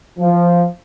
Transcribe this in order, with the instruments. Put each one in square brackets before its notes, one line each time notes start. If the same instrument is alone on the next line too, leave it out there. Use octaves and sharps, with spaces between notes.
[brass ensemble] F3